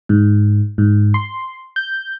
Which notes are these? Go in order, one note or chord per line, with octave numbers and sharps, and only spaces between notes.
G#2
G#2
C6
G6